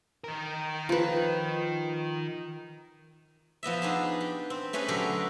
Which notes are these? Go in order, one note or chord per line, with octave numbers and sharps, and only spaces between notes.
D#3 A#4
F3 B4
F3 B3 D#5 E5
D4 D#4 G#4
G4
C4
A3 C#4 G#4 B4 D#5
D3 F#3 F#4 G4 A4 A#4